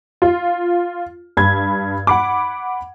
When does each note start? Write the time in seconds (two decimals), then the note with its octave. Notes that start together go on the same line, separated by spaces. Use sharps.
0.22 F4
1.37 G2 B5 G#6
2.07 F#5 B5 D6